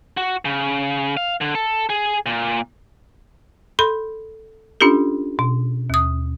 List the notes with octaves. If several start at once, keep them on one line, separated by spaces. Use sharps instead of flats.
F#4
C#3
F5
D3
A4
G#4
A#2
A4 B5 C6
C#4 D4 F4 G4 A4
B2
D#2 D#6